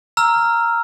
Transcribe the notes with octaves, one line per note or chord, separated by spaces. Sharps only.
A#5 E6 F6